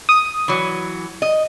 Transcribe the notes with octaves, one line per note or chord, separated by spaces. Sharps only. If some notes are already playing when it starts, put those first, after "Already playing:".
D#6
E3 F#3
D#5